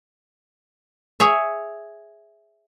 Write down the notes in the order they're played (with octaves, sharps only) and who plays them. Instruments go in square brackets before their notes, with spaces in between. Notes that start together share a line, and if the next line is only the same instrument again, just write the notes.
[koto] G#4 C#5 E5